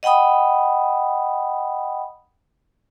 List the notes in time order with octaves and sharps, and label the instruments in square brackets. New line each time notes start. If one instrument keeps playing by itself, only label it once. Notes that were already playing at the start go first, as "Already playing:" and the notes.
[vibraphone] D#5 F#5 G5 B5 D#6